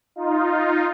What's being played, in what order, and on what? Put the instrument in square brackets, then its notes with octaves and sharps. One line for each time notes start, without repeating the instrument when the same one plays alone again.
[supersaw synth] D#4 F4